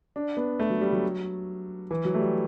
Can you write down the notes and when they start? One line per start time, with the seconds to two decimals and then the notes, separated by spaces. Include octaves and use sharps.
0.16 D4
0.37 B3
0.60 A3
0.70 F#3
0.81 G3
0.93 F#3
1.91 E3
2.05 F#3
2.14 A3
2.19 G3